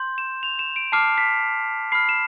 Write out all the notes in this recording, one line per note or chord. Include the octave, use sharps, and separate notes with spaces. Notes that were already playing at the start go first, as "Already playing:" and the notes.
Already playing: C6 G6
E7
F7
E7
D7
A5 D6 F6 C7
B6
B5 F6 C7
E7